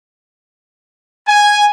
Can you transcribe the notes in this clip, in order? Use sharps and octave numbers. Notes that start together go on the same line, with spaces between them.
G#5